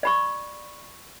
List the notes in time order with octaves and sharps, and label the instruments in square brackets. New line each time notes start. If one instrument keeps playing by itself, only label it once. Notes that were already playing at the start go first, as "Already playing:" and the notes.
[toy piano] D5 B5 C#6